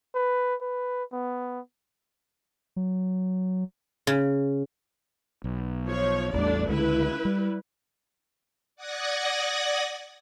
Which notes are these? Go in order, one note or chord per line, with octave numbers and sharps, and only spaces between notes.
B4
B4
B3
F#3
C#3
B1
F3 C#5
A1 E2 G3 A3 D4 D5
C#2 D3 G#3 E4 B4
G3
D5 F#5 D#6 F#6 G#6 A#6